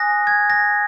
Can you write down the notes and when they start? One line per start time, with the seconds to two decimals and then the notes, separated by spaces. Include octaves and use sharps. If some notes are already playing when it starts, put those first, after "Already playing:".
Already playing: G#5 D#6 F#6 A#6
0.27 G#6
0.50 A#6